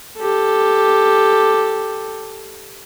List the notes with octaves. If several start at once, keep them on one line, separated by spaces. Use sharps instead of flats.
G4 A4